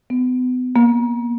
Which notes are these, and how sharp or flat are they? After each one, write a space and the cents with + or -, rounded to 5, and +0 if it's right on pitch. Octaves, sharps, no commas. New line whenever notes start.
B3 +35
A#3 +25